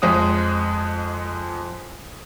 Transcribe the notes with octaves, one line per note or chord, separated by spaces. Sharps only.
F2 G#3 D#6